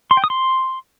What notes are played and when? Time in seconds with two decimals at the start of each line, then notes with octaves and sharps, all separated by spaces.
0.11 C6
0.17 G5
0.24 D#6
0.30 C6